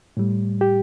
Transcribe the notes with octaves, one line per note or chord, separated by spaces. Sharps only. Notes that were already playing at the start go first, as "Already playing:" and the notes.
A2 G3
G4